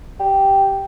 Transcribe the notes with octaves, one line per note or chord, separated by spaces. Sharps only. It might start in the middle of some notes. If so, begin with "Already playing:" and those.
G4